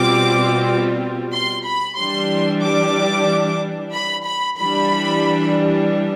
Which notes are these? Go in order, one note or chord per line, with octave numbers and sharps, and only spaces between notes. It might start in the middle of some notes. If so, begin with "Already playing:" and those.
Already playing: B2 G3 C4 F4 D6
C6
B5
E3 G3 D4 C6
D6
B5
B5
E3 G3 D4 B5